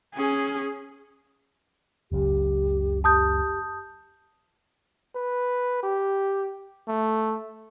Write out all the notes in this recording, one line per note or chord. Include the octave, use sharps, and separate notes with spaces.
C#4 G#4
F#1 C#2 F#2 G4
G4 A5 D#6 G6
B4
G4
A3